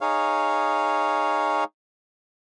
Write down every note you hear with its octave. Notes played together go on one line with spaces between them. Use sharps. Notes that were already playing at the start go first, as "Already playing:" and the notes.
D#4 G#4 C#5 F5